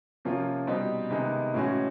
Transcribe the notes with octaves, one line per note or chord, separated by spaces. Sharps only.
C3 F3 A#3 C#4 F4
B2 G3 C4 D#4 G4
C3 D#3 G#3 B3 D#4
A2 E3 G#3 C#4 F#4